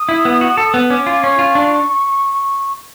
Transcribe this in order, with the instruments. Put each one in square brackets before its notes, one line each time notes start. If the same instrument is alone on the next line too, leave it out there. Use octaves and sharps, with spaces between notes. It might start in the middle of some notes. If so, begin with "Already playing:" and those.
Already playing: [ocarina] D#6
[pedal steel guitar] E4
B3
F#4
A4
B3
[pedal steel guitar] C#4 [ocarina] D6
[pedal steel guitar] F4
[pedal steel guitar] C#4 [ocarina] C#6
[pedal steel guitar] F4
D4